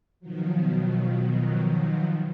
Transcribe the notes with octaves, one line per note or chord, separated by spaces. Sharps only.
B2 D#3 F3 F#3